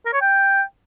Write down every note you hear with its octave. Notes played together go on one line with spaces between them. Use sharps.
A#4
C#5
G5